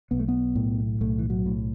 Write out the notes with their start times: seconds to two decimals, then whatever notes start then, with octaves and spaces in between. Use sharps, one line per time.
0.11 B1 B3
0.19 A3
0.28 B3
0.56 A2
1.00 B1 A3
1.19 E3
1.30 F#3
1.46 A2